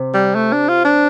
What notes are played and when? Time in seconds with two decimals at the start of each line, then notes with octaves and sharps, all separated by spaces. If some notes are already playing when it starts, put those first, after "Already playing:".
Already playing: C3
0.14 G3
0.35 A3
0.53 D4
0.69 F4
0.85 D4